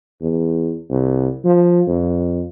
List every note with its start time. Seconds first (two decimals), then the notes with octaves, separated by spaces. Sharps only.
0.21 E2
0.90 C2
1.45 F3
1.87 F2